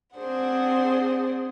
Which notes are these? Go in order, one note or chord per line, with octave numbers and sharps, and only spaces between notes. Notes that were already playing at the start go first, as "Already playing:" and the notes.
C4 D4 G#4 C5 F#5